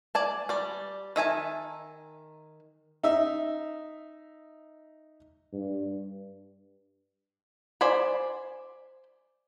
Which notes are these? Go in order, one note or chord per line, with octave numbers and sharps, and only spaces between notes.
D5 G#5 A5
G3 D5
D#3 E5 G#5 A5
D#4 E5
G2
C5 D5 G#5 B5